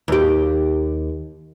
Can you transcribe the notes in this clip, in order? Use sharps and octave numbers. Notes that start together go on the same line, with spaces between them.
D#2 G4